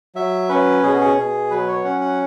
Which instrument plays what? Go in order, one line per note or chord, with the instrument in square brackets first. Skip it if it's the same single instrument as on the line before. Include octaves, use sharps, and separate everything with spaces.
[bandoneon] F#3 E5
C#4 B4
B2 G#4
F#4
G#4
B2
F#3 B4
C#5
C#4 F#5
F#5